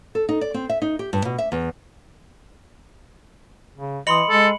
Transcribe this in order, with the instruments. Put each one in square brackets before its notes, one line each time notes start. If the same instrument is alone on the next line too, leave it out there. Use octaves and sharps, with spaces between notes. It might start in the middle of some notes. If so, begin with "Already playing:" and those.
[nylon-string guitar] A4
D#4
D5
C4
E5
D#4
G4
G2
B2
E5
E2
[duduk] C#3
[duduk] E3 [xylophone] D#5 C6 D#6 [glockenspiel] B5 C#7 F#7
[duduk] G#3 [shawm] A4